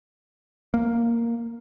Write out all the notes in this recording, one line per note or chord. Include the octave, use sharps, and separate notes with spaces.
A#3